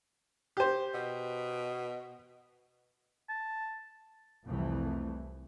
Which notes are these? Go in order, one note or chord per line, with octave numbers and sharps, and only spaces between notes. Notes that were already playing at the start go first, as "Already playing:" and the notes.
G4 C5
B2
A5
C2 F2 E3 A3 C4